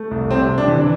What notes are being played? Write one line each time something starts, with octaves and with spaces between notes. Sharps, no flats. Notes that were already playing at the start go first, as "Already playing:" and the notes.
Already playing: A3
C2
C3 C4
C3
D4
E3